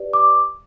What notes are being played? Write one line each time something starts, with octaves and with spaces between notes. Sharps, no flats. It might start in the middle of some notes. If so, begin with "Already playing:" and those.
Already playing: G4 B4 D5
D6